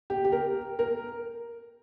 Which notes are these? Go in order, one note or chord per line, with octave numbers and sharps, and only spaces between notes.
G4
G4
A#4
A#4